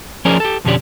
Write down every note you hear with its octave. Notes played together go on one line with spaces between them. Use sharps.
F3 C#4 G#4 A#4 C5 D5
G4 A4
F2 B2 D3 C#4 G4 D5